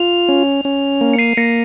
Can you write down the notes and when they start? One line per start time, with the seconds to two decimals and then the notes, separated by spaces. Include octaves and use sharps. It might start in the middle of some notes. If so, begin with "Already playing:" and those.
Already playing: F4 F7
0.29 C#4
0.65 C#4
1.01 A#3
1.14 C#7
1.19 C7 D#7
1.37 A#3 A#6 C#7